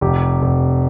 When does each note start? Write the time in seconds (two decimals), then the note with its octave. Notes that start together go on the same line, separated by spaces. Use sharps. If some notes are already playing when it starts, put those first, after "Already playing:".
0.01 F1 G4
0.42 F1